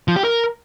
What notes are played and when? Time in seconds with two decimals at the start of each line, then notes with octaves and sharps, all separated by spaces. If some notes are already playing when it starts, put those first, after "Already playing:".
0.08 F3
0.16 G4
0.24 A#4